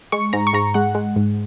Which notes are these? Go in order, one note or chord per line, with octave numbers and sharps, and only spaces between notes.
G#3 C#6
G#2 A#5
C#6
G#2 A#5
G#3 F#5
G#3
G#2